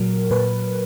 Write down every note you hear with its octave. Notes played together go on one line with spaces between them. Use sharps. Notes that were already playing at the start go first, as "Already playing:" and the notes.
Already playing: A#2 F#3 A#4
A#2 B4